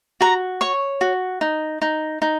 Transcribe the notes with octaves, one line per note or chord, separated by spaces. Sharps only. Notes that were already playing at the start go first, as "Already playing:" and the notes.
F#4 A#5
C#5 C#6
F#4
D#4
D#4
D#4